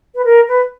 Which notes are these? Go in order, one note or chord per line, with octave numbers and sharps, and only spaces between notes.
B4
A#4
B4